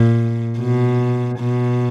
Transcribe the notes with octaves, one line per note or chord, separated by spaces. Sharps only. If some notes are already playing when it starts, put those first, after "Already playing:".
Already playing: A#2
B2
B2